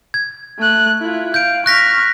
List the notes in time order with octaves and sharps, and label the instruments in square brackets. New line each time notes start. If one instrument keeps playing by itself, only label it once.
[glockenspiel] G#6
[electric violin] A3 F#6
E4 F4
[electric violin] F5 [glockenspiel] G6 D7
[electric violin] C#6 F6 [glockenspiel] F#6 A#6 B6